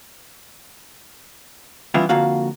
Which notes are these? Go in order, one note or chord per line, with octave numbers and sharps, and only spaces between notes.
E3 G3 B3 C#4 E4 F4
F2 D3 A#3 F4 F#4 F5